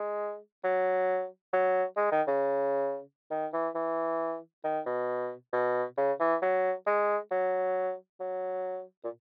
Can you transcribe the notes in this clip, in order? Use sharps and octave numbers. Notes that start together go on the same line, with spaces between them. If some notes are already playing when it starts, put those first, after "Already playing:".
Already playing: G#3
F#3
F#3
G#3
D#3
C#3
D#3
E3
E3
D#3
B2
B2
C#3
E3
F#3
G#3
F#3
F#3
A#2